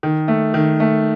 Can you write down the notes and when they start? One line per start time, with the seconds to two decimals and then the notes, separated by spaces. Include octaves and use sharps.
0.03 D#3
0.28 A3
0.54 D#3
0.80 A3